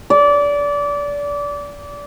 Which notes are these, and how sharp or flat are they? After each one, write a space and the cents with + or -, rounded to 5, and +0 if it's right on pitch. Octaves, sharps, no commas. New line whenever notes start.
D5 -25